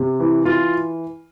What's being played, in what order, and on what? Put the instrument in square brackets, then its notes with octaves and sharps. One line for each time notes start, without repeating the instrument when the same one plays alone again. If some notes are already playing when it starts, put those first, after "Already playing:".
Already playing: [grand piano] C3
E3
E3 F4